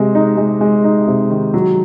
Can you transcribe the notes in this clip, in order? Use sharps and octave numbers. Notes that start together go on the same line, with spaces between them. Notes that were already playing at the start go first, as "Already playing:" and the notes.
Already playing: C3 G#3
D#4
G#3
G#3
D#4
C3
D#3
F#3